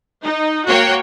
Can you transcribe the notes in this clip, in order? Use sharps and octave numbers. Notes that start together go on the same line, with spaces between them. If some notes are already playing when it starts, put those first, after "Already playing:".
D#4
A#3 F#4 C#5 G5